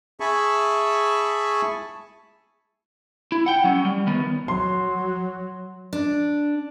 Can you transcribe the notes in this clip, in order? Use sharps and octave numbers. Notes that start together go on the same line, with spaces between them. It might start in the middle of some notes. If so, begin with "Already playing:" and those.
G#4 E5 G#5 A5 B5 C#6
E4
F#5 G5
F#3 C#4
G3
D#3 B3
F#3 C6
D4